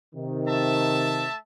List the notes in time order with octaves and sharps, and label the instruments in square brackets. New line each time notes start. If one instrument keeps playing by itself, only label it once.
[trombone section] C3 D#3
[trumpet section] A3 E5 A5